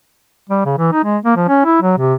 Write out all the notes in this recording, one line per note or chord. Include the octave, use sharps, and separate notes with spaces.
G3
C#3
E3
D#4
G#3
A#3
F3
C#4
E4
F#3
C3